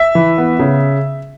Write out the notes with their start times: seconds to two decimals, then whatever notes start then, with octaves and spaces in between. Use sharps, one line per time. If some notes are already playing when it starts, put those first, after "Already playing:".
Already playing: E5
0.15 E3
0.38 B3
0.59 C#3